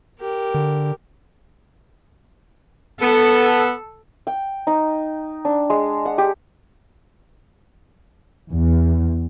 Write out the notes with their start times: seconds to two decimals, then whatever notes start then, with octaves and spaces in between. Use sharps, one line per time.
0.19 G4 A#4
0.54 D3
3.02 B3 A4
4.27 G5
4.67 D#4
5.45 D4
5.70 G#3
6.05 F#5
6.18 G4
8.50 E2